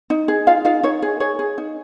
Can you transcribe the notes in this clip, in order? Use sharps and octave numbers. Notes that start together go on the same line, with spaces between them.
D#4
G#4
D#4 F4 F5
D#4 F4 F5
D#4 C#5
G#4
G#4 C#5
G#4
D#4